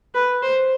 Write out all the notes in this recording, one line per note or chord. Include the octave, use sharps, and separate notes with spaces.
B4
C5